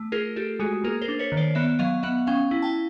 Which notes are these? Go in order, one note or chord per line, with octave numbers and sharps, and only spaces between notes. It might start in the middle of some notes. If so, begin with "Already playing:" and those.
Already playing: A3
F4 G#4 A#4
F4 G4 A4
G#3 F#4 G#4
A#3 G#4 A#4
A#4 C5
D4
B4 C#5
D#3
C5 D5
B3 D5 E5
F#3 D#5 F5
B3 E5 F#5
C#4 F5 G5
E4
G5 A5